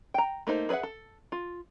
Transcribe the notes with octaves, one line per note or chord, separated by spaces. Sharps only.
G5 A#5
A3 A#3 D#4 C5
G#4 B4 D5 E5 F#5
A4
F4